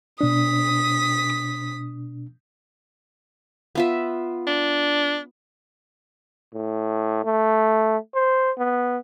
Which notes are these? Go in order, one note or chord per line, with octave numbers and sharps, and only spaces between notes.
B2 D4 D#6 B6
B3 F4 E5
D4
A2
A3
C5
B3